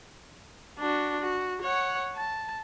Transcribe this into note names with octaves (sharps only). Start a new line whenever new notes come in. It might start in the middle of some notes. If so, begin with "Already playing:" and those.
D4 F#4
F#4
C#5 F#5
A5